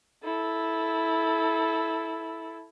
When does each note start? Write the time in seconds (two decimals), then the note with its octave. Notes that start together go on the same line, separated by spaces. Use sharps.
0.24 E4 A4